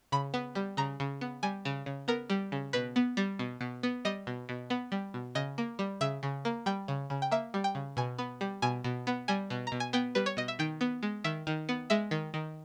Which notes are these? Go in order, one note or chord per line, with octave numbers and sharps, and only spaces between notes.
C#3 B5
B3
G3
C#3 A#5
C#3
B3
G3 G#5
C#3
C#3
B3 A#4
G3
C#3
B2 B4
B3
G3
B2
B2
B3
G3 D#5
B2
B2
B3
G3
B2
C#3 D#5
A#3
G3
C#3 E5
C#3
A#3
G3 G5
C#3
C#3
G5
A#3 E5
G3
G5
C#3
B2 G#5
B3
G3
B2 G#5
B2
B3
G3 G#5
B2
B2 A#5
G#5
B3 G5
G3 B4
C#5
B2 D#5
E5
D#3 G5
B3
G#3
D#3 E5
D#3
B3
G#3 E5
D#3
D#3